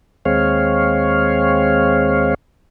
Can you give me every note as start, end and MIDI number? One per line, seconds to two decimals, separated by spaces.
0.25 2.34 39
0.25 2.34 56
0.25 2.34 60
0.25 2.34 73
0.25 2.34 77